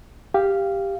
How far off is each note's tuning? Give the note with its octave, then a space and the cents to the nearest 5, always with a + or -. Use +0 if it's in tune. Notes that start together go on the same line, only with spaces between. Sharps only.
G4 +5 F5 -10